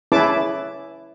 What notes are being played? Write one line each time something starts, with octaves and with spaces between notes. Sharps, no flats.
C#4 E4 G#4 B4 A5 D6